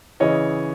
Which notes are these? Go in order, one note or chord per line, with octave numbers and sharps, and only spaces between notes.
C#3 E3 C#5 D#5